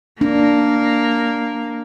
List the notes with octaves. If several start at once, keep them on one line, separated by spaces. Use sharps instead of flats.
A#3 D4